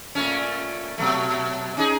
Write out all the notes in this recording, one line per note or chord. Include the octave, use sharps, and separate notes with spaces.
A#2 A3 C#4
B2 F#3 A3
C#4 D#4 G#4